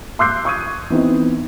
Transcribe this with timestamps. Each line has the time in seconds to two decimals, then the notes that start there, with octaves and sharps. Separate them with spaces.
0.19 C6 D6 E6 F#6 G6 C7
0.45 C#6 D#6 G#6 D#7
0.90 E3 B3 C4 D#4